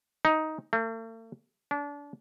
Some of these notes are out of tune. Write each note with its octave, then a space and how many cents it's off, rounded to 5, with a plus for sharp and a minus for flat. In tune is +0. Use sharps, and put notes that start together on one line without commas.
D#4 +10
A3 +45
D4 -30